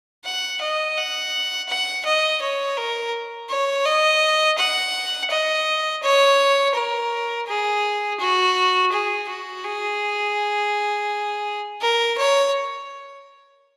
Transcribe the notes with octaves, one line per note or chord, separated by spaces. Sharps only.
F#5
D#5
F#5
F#5
D#5
C#5
A#4
C#5
D#5
F#5
D#5
C#5
A#4
G#4
F#4
G#4
F#4
G#4
A#4
C#5